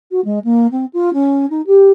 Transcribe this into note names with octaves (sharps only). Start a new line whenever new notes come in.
F#4
G#3
A#3
C4
F4
C#4
D#4
G4